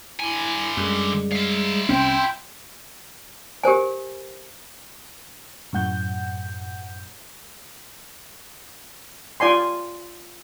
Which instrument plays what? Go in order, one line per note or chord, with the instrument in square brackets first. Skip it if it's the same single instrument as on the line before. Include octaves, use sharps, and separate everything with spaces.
[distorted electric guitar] D3 G#5 [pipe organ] E4
[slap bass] F#2 [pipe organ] G3 G#3 G#4
[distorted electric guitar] E4 F5
[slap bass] C2 C4 C#4 [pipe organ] G5 C6 G6
[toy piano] G4 A#4 C5 G#5
[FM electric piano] F#2 A2 F#5 G6
[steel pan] F4 D5 G#5 C6